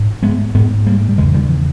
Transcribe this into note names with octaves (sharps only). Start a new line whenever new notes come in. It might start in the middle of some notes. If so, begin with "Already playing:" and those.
Already playing: G#2
G#3 B3
G#2 G#3 B3
G3 A#3
G3
E2 C#3 E3 G#3
D#3 G3
E3